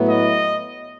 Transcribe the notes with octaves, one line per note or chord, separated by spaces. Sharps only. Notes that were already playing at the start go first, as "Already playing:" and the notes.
Already playing: A2 F#3 B3 E4
D#5